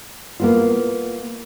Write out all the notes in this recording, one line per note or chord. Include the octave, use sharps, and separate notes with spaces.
A#3 B3 F4